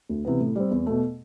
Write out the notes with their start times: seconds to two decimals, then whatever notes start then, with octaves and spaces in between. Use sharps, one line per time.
0.09 D2
0.25 C3 E3 B3
0.40 A2
0.56 G3 C4
0.71 E2
0.86 B2 A3